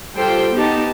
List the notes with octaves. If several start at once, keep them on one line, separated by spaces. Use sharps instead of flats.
G3 F4 G4 A4 C5 G5
B3 D#4 G4 A5